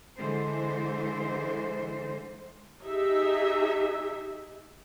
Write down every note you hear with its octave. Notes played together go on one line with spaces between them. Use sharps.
D3 E3 G#3 C5
D#4 G4 G#4 E5